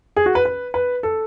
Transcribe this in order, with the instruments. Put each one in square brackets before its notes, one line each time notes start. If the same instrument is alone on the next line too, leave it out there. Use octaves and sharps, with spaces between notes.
[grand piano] G#4
F#4
B4
B4
B4
A4